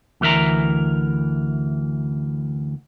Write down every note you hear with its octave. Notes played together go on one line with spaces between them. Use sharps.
D2 E3 A#4 E5 A#5